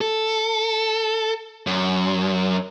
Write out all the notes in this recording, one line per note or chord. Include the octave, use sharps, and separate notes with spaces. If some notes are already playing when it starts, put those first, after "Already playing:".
A4
F#2